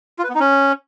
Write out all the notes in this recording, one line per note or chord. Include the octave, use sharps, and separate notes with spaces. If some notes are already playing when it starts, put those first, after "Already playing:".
F4
B4
B3
D#4
C#4